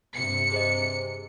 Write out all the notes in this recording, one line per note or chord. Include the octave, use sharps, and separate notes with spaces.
G2 C3 C#7
G#4 C5 D#5